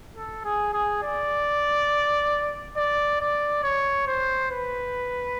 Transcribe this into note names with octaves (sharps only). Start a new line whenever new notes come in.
A4
G#4
G#4
D5
D5
D5
C#5
C5
B4